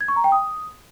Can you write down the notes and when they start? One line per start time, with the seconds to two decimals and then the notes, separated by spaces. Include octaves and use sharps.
0.01 G#6
0.08 C#6
0.16 A#5
0.24 G5
0.32 D#6